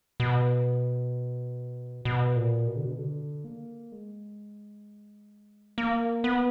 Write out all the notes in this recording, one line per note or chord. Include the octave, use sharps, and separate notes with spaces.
B2
B2
A#2
B2
D3
B2
D3
A#3
G#3
A#3
B3